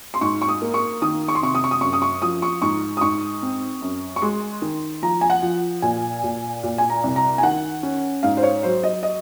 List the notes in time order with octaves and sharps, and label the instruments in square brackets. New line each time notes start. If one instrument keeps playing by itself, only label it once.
[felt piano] C6
G#2 C#6
C#6
D#6
A#3
C#6
D#3 D#6
C#6
C6
C3 C#6
D#6
C#6
D#6
F#2 C#6
D#6
C#6
F3 D#6
C#6
G#2 C#6
D#6
G#2 C#6
C4
F#2
C#6
G#3 C6
D#3
F3 A#5
G#5
F#5
F3
A#2 G#5
A#2
A#2
G#5
A#5
C2
A#5
G#5
D#3 F#5
C#4
G#2 F5
C5
C#5
F#3 C5
D#5
D#5